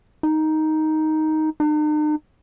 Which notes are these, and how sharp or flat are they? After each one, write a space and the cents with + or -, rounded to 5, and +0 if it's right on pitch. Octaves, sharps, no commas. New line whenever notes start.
D#4 +5
D#4 -45